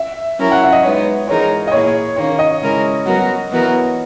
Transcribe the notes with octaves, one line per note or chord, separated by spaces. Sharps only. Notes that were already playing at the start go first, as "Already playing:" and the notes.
Already playing: E5
F#3 C#4 E4 A#4
F#5
E5
D#5
G#3 B3 D#4 C#5
E3 G#3 D#4 A#4 C#5
D#5
A#2 A#3 E4 G#4 C#5
D#3 A#3 C#4 C#5
D#5
C#3 G#3 C#4 E4 A#4
F#3 B3 F#4 A#4
E3 B3 F#4 A#4